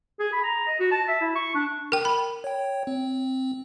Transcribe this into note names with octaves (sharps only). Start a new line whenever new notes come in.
G#4
B5
A#5
D#5
F#4
A5
E5
E4
C#6
D4
A#4 G5
B5
C#5 G5
C4